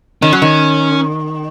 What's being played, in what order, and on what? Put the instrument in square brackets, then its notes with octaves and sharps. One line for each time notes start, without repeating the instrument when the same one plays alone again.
[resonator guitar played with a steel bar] D#3 [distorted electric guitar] C#4
[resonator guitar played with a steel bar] F#3
D#3